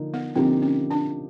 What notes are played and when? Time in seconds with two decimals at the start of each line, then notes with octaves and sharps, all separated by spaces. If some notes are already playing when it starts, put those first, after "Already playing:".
Already playing: D3 F3 A#3 D#4
0.14 B3
0.35 D3 F3 A#3 C4 D#4 G4
0.62 C#4
0.91 D4